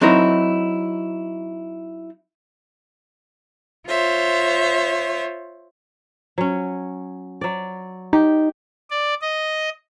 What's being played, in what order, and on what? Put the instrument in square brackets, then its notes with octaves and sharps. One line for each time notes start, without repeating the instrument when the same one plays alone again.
[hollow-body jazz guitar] F#3 C4 D#4 E4 A#4
[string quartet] F4 C5 C#5 E5
[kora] F#3 C#4
F#3 D5
[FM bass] D#4 [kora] G4
[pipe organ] D5
D#5